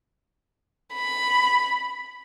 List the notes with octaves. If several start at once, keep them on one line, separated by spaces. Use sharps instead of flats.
B5